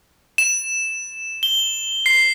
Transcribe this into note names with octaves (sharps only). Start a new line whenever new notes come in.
E7
G7
C7